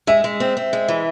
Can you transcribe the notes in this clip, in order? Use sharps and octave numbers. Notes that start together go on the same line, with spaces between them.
G#3 E5
G#3
C4
C4
G#3
E3